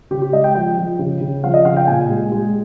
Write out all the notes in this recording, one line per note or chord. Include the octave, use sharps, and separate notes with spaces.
C#3 G4
G4
G#3 D#5
G5
F3 G5
F3
C#3
C#3
F3 F5
D#5
C#3 F5
G5
A#2 G#5
G#3
G#3